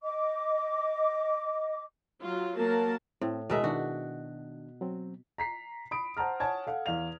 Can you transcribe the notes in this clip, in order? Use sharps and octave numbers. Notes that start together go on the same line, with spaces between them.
D#5 D6
F#3 F4
F#3 A#3 A#4 A5
A2 C4
D#2 B2 G#3 A#4 E5 A5
D#3 D4 F#4
F#3 C4
A#5 B6 C7
B5 D#6 D7
C5 F#5 A5 A#5 F6
C#5 F#5 G#5 A5 G#6
A4 F5 F#5
E2 F5 F7